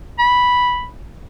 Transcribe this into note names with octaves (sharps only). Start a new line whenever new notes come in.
B5